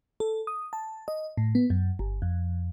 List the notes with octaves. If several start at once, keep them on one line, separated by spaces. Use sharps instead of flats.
A4
D#6
A5
D#5
A2
B3
F#2
G1
F2